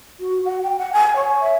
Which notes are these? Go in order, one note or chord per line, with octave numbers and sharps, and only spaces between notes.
F#4
F#5
G5
F#5
G#5
C#5
E5